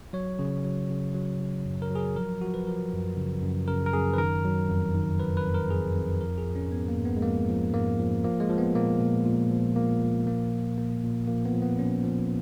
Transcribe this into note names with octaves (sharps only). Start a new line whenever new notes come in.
F#3 C#5
C#3
F#3
C#3
F#3
C#3
F#2
A#4
F#3
G#4
A#4
F3 A#4
F3 F#4
B4
F3 A#4
F#2
C#3
F#2
C#3 A#4
A#4
F#2 G#4
B4
D#3 A#4
F#3
F2
D#3
F#3 B4
B4
F2
A#4
F2 G#4
F2
F3 A#4
G#4
F3
C#4
G#2 B3
A#3
G#2
B3
G#3
F3 A#3
F3
G#2 A#3
F3
F3 A#3
G#3
F3
B3
A#2 A#3
A#2
A#2
F3
A#2 A#3
F3
A#2 A#3
F3
A#2 A#3
A#2
F3 A#3
B3
F3
B3
F3 C#4
F3